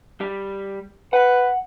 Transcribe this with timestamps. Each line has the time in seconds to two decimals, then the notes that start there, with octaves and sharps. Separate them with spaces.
0.21 G3
1.13 B4 F#5